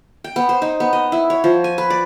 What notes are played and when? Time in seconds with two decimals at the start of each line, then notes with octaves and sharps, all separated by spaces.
0.24 G5
0.36 B3
0.49 C5
0.62 D#4
0.80 B3
0.93 D#5
1.12 E4
1.30 C#5
1.44 F3
1.64 G#5
1.78 B4
1.90 D5